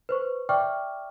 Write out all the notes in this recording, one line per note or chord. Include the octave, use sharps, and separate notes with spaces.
B4 C5 C#6
D5 E5 G5 C#6 D6 F6